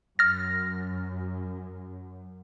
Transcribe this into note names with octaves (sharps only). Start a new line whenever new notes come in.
F#2 F6 A6 A#6